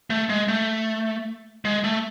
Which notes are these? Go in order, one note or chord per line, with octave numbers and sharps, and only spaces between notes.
A3
G#3
A3
G#3
A3